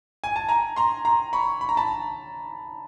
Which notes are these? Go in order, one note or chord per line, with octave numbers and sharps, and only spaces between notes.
G#5
A5
G#5 A#5
A#5 C6
A#5 C6
B5 C#6
B5
A#5
A5 B5